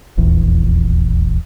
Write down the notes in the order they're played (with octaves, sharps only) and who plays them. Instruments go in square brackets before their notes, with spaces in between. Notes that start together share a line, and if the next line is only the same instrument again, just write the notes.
[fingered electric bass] D#1 A#1 E2